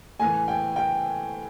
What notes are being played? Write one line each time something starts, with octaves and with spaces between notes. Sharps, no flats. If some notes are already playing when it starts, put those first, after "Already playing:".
A2 E3 G#5
G5
G5